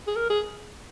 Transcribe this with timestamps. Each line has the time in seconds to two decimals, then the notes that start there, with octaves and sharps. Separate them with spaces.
0.07 G#4
0.16 A#4
0.30 G#4